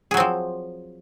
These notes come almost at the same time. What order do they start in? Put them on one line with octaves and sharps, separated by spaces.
G#4 F#3 C4 F3